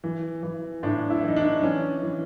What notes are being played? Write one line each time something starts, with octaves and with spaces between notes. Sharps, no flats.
E3
E3
A2 D4
E4
E3 D#4
D4
E3 C#4
E3